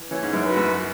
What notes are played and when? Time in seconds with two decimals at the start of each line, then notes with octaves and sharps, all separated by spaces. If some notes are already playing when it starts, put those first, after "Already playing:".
Already playing: E3
0.11 E3 C#4
0.23 G#2
0.33 F#2
0.45 F#4 B4
0.57 F#2